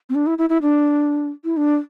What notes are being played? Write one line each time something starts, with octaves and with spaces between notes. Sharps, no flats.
C4
D4
E4
E4
E4
D4
E4
D4